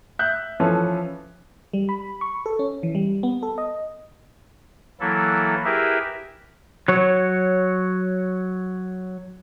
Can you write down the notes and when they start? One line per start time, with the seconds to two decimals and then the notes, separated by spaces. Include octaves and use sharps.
0.19 E5 F#6 G6
0.60 E3 F3 C#4 A4 B4
1.73 G3
1.89 B5
2.21 C#6
2.46 A4
2.59 C#4
2.83 E3
2.95 G3
3.23 B3
3.43 A4
3.58 D#5
5.00 E3 F#3 A#3 E4 A4
5.64 E4 G4 G#4 A#4 B4 E5
6.88 F#3 C#5